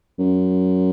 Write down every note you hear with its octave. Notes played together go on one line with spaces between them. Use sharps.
F#2